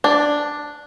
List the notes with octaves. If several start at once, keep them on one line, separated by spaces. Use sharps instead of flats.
D4